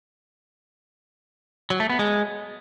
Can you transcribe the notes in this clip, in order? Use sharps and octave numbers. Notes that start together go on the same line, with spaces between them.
F#3
A3
B3
G#3